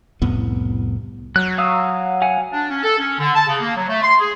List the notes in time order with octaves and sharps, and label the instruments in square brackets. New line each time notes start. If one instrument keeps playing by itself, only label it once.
[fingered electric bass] C2 F2 A2 B3
[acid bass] F#3 [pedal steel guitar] F#6
[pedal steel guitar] F5 D#6 E6
F5 F#5 G#5
[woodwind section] D4
C#4
A4
C#4
D3
A5
C#3
A#3
F#3
A3
C6
G#4